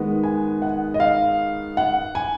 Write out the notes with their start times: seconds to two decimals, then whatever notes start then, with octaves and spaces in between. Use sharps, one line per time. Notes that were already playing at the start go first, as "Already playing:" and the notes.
Already playing: D#3 G#3 B3
0.23 G#5
0.62 F#5
0.94 D#5
1.00 F5
1.77 F#5
2.15 G#5